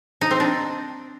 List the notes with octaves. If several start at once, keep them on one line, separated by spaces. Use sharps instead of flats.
D#4
C4
D4